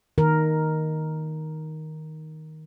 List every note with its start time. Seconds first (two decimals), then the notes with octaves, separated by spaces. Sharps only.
0.18 D#3 A#4